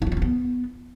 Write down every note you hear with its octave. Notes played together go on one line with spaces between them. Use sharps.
D#4
F4
B3
C#4
B3